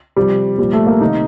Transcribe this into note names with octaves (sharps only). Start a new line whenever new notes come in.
C3 F3 G3
A#2 F3 G3
A3
A#3
C3 D#3 D#4